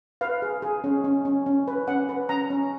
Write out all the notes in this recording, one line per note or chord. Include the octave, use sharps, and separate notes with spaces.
B4 F5
G#4
G#4
C#4
C#4
C#4
C#4
B4
C#4 F#5
B4
C#4 A#5
C#4